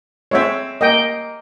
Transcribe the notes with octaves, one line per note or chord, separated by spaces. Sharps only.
G#3 C4 C#5 E5
A#3 D#5 G5